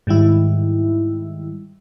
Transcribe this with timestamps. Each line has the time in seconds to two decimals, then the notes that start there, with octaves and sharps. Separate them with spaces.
0.07 G#2 D#3 G3 E4